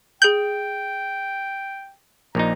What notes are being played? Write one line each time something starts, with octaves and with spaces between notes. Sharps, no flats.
G#4 G5 G6 F#7
A#1 A#2 D#4 A#5